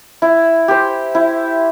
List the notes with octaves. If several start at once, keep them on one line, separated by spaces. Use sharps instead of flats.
E4
G4 C5
E4